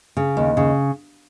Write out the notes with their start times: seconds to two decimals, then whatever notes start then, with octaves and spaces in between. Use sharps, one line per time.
0.17 C#3
0.37 D#2
0.57 C#3